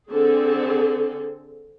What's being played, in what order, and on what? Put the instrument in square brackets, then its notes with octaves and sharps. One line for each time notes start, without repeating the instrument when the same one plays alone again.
[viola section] D3 C4 G#4 A4